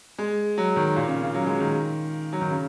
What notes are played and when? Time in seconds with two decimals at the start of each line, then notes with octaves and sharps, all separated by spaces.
0.18 G#3
0.58 F#3
0.76 D#3
0.96 A#2
1.08 C#3
1.22 C#3
1.35 F#3
1.46 G#3
1.60 D#3
2.33 F#3
2.41 D#3
2.50 C#3